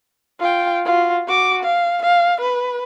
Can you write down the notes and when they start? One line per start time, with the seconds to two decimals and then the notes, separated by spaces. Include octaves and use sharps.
0.39 F4 G5
0.85 F4 F#4
1.27 F#4 D6
1.63 F5
2.02 F5
2.41 B4